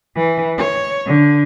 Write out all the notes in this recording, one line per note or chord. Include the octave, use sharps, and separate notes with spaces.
E3
C#5
D3